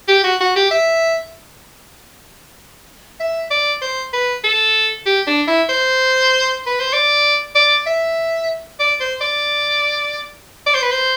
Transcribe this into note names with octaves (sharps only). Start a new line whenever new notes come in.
G4
F#4
F#4
G4
E5
E5
D5
C5
B4
A4
G4
D4
E4
C5
B4
C5
D5
D5
E5
D5
C5
D5
D5
C5
B4
C5